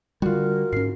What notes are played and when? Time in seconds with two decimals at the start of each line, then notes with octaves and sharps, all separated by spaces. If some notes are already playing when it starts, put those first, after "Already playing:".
0.22 D3 G3 F4 F#4 A#4
0.73 G#2 C#4 C7